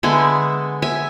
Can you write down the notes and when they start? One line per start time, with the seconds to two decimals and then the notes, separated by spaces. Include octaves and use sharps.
0.03 D3 G#3 B3 E5 G#5
0.82 E5 G#5